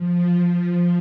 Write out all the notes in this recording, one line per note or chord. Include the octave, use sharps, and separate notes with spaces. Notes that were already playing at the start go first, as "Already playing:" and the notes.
Already playing: F3
F3